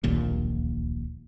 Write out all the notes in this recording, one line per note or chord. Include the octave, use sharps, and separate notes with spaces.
D1 A#1 D#2 A#2